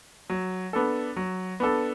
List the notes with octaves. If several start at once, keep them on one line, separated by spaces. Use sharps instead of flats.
F#3
B3 D4 A4
F#3
B3 D4 A4